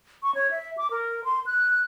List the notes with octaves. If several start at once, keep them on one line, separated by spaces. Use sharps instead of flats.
C#6
C#5
E5
D6
A#4
C6
F#6